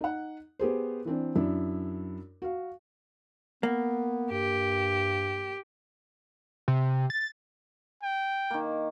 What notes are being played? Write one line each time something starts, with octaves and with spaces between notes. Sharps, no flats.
D#4 F#5
B3 G4 G#4 C5
E3 C4 D4
F#2 D4 E4
F#4 F5
A#3 B3
G2 G4
C3
A6
G5
D#3 A#3